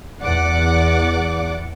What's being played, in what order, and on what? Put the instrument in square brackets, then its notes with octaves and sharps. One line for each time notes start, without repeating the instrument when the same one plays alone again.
[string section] E2 D5 F#5 D6